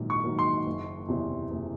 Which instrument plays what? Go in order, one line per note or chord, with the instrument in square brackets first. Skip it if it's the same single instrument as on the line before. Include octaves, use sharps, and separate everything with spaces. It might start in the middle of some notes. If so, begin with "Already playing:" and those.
Already playing: [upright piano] A#1 G#2 D#3 F#3 A#3
[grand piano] C#6
[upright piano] G#2 D#3 F#3 A#3
[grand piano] C6
[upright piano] F#1
E2 C3
F#1